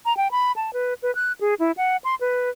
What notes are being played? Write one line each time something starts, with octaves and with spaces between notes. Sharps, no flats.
A#5
G5
B5
A5
B4
B4
F#6
G#4
E4
F#5
C6
B4